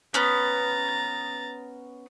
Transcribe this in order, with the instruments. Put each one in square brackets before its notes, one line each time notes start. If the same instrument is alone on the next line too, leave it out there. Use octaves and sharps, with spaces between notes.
[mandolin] B3 C#4 [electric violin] A#5 A6